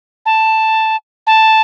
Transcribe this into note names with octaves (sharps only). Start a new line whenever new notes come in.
A5
A5